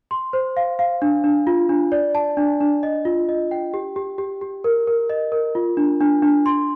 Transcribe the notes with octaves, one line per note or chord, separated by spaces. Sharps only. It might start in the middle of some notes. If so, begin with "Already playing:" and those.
C6
C5
F5
F5
D4
D4
F4
D4
D5
A5
D4
D4
D#5
F4
D#5
G5
G4
G4
G4
G4
A#4
A#4
D#5
A#4
F4
D4
D4
D4
C6